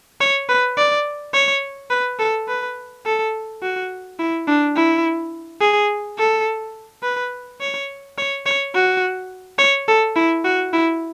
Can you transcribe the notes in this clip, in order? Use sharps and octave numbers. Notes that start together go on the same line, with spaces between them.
C#5
B4
D5
C#5
B4
A4
B4
A4
F#4
E4
D4
E4
G#4
A4
B4
C#5
C#5
C#5
F#4
C#5
A4
E4
F#4
E4